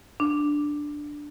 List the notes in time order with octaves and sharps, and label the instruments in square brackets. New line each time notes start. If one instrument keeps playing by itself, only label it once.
[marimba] D4